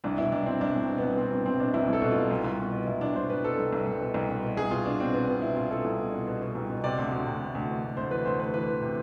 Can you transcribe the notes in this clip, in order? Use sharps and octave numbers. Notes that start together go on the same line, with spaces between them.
C2 D4
B2 E4
C2 D4
C2 C4
C2 D4
C2 C4
B2
B3
C2
B2 C4
C2 D4
C2 C4
B2 D4
C2 E4
C2
A4
B2
C2 F4
C2
C2
B2
B2
C2 E4
C2 D4
C2 C5
C2 B4
B2 A4
C2
C2
C2
B2
C2
B2
B2
C2 G#4
B2 F4
B2 D4
B2 C4
B2 B3
B2 C4
B2 E4
B2 F4
B2 A4
C2
B2
B2
B2
B2
C2
B2
C3 D5
D2
D2
C3
D2
D2
E3
D2
D2 C5
E3 B4
D2 C5
D2 B4
E3 B4
E3
C3